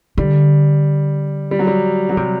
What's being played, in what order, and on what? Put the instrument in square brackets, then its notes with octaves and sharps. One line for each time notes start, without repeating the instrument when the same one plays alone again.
[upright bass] D3 [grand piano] G3
[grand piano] G3
F#3
G3
F#3
[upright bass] C3 [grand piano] G3